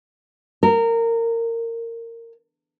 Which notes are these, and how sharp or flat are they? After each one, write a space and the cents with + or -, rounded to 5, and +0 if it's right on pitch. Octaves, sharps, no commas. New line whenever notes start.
A#4 -20